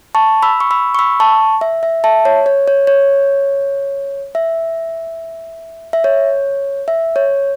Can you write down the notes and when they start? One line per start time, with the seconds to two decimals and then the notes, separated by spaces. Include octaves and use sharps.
0.15 A5 C#6
0.43 B5 E6
0.60 C#6
0.71 B5 E6
0.95 C#6
0.99 B5 E6
1.20 A5 C#6
1.61 E5
1.83 E5
2.04 E5 A5
2.25 C#5
2.46 C#5
2.68 C#5
2.87 C#5
4.35 E5
5.93 E5
6.04 C#5
6.88 E5
7.16 C#5